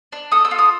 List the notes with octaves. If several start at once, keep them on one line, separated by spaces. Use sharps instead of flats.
D4
A4 D#6
E6
F4
D#6